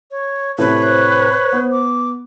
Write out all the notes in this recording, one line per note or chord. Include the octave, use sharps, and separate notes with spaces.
C#5
A2 C3 B4 C#5
C5
B3
D6